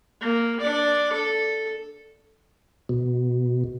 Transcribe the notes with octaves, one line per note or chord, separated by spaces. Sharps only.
A#3
D4 D5
A4
B2